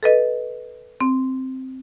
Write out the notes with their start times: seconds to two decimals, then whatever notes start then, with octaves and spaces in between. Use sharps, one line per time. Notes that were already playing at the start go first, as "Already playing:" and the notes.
0.03 A4 B4 D#5
1.01 C4